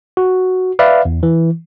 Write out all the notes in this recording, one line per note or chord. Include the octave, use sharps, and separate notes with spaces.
F#4
B4 D5 E5 F5
E2
E3